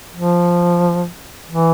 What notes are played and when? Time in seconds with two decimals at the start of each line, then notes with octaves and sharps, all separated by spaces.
0.14 F3
1.48 E3